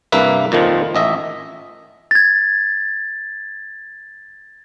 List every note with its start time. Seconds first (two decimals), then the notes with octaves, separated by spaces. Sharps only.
0.12 C2 G2 A#3 B4 E5
0.52 F2 A#2 D#3 F3
0.95 A1 D#5 E5
2.11 G#6 A6